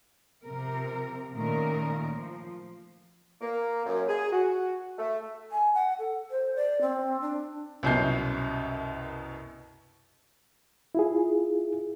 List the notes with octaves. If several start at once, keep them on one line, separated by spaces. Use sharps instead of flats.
C3 F3 A#4
A#2 D#3 A3 A#3 C#4 A#4
F3
A#3
F#2
G#4
F#4
A3
G#5
F#5
A4
C5
D5
C4
D4
C2 F#2 B2 C#4 G6 C7
E4 F4 G#4